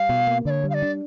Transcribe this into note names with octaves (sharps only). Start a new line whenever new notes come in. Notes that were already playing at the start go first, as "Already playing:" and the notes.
Already playing: G3 F5
B2
A#3
D3 C#5 D5
G3
F5
D5
D4